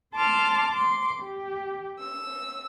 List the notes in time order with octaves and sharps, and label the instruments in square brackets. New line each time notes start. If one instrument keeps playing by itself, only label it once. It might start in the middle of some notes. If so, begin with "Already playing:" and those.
[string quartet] A5 C6 D6 F6
C6 D6
G4
E6